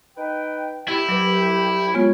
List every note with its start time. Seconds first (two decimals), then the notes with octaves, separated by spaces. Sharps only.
0.17 D#4 B4 G5
0.88 C2 E4 G4
1.09 F#3 B4
1.94 G#3 B3 C#4 F4 C#5